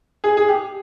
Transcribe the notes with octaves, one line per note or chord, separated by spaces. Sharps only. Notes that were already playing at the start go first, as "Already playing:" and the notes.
G#4
G#4
G4